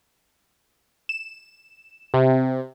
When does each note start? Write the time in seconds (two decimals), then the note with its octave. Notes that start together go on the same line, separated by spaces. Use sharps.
1.09 E7
2.14 C3